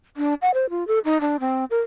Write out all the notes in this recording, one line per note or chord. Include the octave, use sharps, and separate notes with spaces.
D4
F#5
C5
F4
A4
D#4
D4
C4
A#4